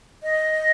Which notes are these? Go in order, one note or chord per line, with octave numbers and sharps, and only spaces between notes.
D#5